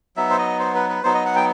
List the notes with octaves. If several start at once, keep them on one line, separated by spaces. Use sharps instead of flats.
F#3 B3 D#4 E5
C5
D#5
C5
B4
B4
F#3 B3 D#4 C5
D#5
F#5
G5